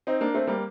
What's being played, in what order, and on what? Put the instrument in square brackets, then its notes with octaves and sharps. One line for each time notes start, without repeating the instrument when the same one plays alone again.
[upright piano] C4 D#4
A#3 D4
A3 C4
G3 A#3